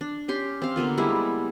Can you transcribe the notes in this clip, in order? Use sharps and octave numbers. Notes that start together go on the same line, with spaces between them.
D4
C#4 G4 C6
C4 F5
D3 A#3 B3 F4
G3 G#3 E4